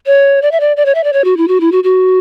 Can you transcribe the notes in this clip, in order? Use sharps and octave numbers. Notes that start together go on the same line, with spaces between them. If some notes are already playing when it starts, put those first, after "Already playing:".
C#5
D5
E5
D5
D5
C#5
E5
D5
C#5
F#4
E4
F#4
E4
F#4
F#4